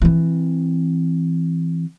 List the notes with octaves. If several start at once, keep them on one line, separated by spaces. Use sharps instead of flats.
E3 C4